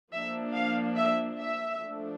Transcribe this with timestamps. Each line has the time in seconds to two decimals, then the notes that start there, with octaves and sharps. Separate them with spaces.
0.12 F3 A#3 D4 E5
0.54 F5
0.96 E5
1.38 E5
1.81 F3 A3 D4